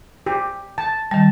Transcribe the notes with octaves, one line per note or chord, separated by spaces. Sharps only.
G4
A5
D#3 G3 A5